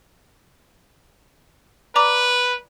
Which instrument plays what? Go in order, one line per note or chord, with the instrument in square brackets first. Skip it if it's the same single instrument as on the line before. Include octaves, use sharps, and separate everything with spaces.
[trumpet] B4 [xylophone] D5 A#5 D6